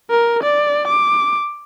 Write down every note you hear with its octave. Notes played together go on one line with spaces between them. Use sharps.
A#4
D5
D6